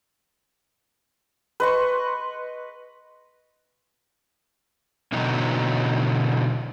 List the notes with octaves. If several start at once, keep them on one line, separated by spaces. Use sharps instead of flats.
B4 D#5 C6 C#6
B2 D3 E3 F#3 D#4